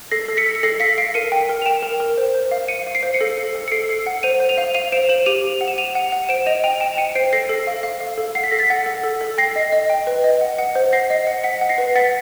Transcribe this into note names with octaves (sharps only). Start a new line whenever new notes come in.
A4 A#6 C7
A4
B6 C#7
A4
C#7
A4 A#6 C7
F5 B6 C#7
F5 C7 D7
A#4 C#7 D#7
G5
A#4
F7
G5 D7 E7
A#4
A#4
C5
C5
F5
F5 C#7 D#7
F5
C7 D7
C5
C#7
A4 A#6 C7
A4
A4
C#7
A4 C7 D7
A4
F#5
C5 D#7 F7
C5
D#7 F7
F5
F5 D#7 F7
C5 D7 E7
C5 E7 F#7
G4 D#7 F7
G4
F#5
E7
F#5 D#7 F7
F#5
F#5
C5 D7 E7
D#5 D#7 F7
G5 D#7 F7
G5 D7 E7
G5 C#7 D#7
C5 C7 D7
A4 A#6 C7
A4
F5
F5
F5
A4
F#5 C7
B6
A4 A#6
A6 B6
F#5
A4
A4
A4
G5 A#6 C7
D#5
D#5
G5
B4
D#5
F#5
F#5
C5
F#5 A#6 C7
D#5
F#5
F#5 B6 C#7
F#5
A#6 C7
B4
F#5 A6 B6